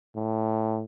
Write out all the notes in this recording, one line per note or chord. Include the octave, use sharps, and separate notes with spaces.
A2